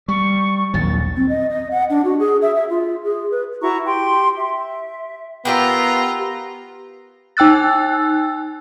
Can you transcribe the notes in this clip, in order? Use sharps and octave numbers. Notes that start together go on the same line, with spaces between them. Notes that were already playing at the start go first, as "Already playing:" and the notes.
G3 C#6
A#1 D#2 F#3 A6
C4
D#5
D#5
F#5
D4
F#4
G#4
E5
E5
F4
G#4
B4
E4 F#4 A#5 C#6
G4 G5 C6
E5
B3 F4 G4 A#4 E5 A#5
D#4 G5 E6 F#6 A6